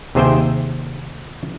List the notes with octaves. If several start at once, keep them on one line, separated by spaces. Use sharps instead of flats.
D#2 C3 G#4 C5 E5 G5